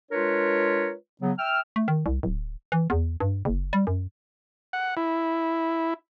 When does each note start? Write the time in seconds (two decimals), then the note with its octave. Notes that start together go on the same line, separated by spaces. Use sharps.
0.12 G#3 D4 F4 A#4 B4 C#5
1.22 C#3 F#3 B3
1.39 E5 G5 E6 F6
1.76 A3
1.88 D#3
2.06 C2
2.23 D1
2.72 E3
2.90 E2
3.20 G2
3.45 F#1
3.73 G3
3.87 F#2
4.73 F#5
4.97 E4